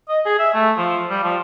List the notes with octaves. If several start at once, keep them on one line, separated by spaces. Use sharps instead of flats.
D#5
G#4
E5
A3
F3
G3
F3